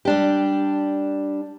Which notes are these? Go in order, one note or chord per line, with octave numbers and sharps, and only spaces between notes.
G3 D4 G4